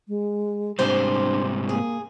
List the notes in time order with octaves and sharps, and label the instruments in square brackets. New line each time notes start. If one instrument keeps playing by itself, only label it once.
[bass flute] G#3
[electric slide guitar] G#2 C3 G3 [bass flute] D4 [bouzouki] C5
[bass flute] A#3 [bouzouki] G#4